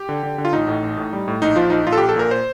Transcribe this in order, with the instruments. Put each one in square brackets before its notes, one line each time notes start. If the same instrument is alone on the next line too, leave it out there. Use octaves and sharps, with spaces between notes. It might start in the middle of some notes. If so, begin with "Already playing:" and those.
Already playing: [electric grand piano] G4
D3
D3
D3
F4
A1 D#4
A2
A1
A2
G3
A2
A#1 D#4
F3 F4
A#1 D#4
A#1 F4
A4
A#1 G4
A4
A#2 A#4
C5